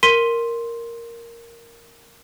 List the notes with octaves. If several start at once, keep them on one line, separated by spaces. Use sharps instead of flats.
A#4 C6 B6 D#7 G7